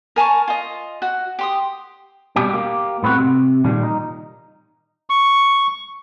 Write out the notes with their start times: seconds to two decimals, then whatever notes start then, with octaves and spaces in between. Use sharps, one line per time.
0.16 A#4 G#5 A5 C#6
0.48 F4 D#5
1.02 F#4
1.39 G4 C6 D#6
2.36 B2 G3 G4
2.51 A#3 G4
3.03 A2 B3 C4 F#4
3.18 C3
3.64 A#2 D#3 F3 G3
3.83 D#4
5.10 C#6